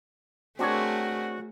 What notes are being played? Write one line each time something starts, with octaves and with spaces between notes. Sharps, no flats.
A3 C4 D4 F#4 G#4 A#4 C#5